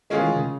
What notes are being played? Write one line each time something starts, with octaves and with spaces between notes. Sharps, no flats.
D#3 G#3 C#4 F4 G#4
E3
D#3
C#3